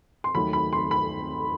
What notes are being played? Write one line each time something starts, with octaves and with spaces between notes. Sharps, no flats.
C6
D#2 D#3 F#3 A3 B5
B5
C6
B5